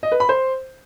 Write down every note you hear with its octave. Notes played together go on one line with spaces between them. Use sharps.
D#5
B4
B5
C5